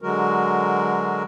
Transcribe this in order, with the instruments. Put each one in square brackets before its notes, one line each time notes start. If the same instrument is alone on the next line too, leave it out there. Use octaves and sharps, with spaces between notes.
[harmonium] D3 F#3 G#3 F#4 A#4